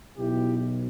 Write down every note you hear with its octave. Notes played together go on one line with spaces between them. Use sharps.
B1 B2 E4 G4